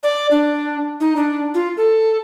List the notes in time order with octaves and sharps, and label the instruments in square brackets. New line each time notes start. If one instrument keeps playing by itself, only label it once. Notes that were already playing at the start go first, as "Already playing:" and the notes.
[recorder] D5
D4
D#4
D4
F4
A4